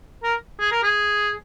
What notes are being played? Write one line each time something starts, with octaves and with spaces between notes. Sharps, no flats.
A#4
G#4
A#4
G#4